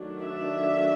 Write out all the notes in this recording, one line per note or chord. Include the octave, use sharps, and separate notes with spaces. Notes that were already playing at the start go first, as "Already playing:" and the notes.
Already playing: D#3 F#3 A3 D4
E5